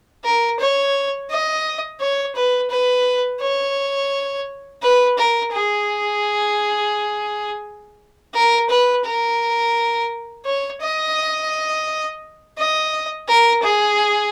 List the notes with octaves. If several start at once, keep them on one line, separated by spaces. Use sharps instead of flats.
A#4
C#5
D#5
C#5
B4
B4
C#5
B4
A#4
G#4
A#4
B4
A#4
C#5
D#5
D#5
A#4
G#4